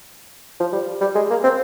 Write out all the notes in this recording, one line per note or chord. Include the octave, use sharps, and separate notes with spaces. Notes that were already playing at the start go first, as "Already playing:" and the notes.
F3
G3
G3
G#3
A#3
C4